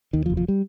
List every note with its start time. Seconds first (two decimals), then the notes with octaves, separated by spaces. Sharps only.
0.13 D#2 D#3
0.26 F3
0.30 F1
0.37 F3
0.48 G3